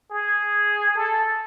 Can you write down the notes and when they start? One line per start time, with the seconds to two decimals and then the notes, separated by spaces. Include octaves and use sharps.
0.11 G#4
0.95 A4